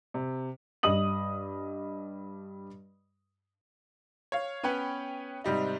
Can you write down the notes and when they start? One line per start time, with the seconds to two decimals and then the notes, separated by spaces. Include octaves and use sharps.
0.14 C3
0.83 G2 D#5 D#6 F#7
4.32 C#5 F5
4.63 B3 C#4 B4 C#5 G5
5.44 G#2 C3 G3 D#4